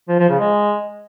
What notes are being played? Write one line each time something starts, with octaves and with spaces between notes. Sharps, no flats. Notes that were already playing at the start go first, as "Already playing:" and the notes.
F3
F3
C#3
G#3